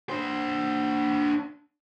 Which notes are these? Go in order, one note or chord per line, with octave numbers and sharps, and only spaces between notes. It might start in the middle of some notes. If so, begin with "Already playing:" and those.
D4 C5